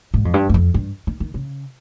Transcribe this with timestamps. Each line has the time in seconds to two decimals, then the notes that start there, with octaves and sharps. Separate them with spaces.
0.14 G#2
0.25 F2
0.34 G2
0.49 G2
0.54 F2
0.74 G2
1.07 D#3
1.20 D#3
1.34 C#3